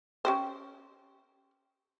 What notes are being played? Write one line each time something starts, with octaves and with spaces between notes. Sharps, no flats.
C#4 G4 C5